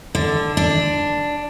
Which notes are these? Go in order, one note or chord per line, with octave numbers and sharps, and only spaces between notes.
D3
D4